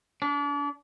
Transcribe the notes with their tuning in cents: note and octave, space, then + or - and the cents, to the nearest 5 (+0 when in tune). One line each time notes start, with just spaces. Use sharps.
D4 -35